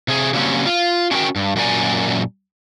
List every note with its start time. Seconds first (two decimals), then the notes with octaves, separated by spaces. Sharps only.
0.08 C3 G#4
0.33 C#3 F#3 G3 A#3 C4 C#4
0.66 F4
1.11 C#4 D4 F#4 A4 A#4 G5
1.36 G2
1.56 F#2 A#2 F#4 A#4 D5 G#5